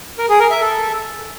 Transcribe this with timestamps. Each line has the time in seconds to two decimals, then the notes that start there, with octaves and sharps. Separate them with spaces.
0.18 A#4
0.29 G#4
0.40 A#4
0.51 E5
0.61 A4